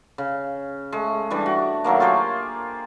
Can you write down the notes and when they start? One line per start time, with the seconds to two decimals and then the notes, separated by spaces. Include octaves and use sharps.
0.18 C#3
0.92 G#3 A3
1.30 E3 G3 D4
1.46 F#4
1.84 D#3 F#3 A3 A#3
2.00 F4 G4 G#4 C5